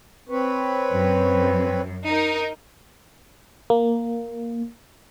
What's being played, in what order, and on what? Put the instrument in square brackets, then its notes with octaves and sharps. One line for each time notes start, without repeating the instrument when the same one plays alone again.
[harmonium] C4 B4 C#5
[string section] F#2
D#4 A#4
[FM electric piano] A#3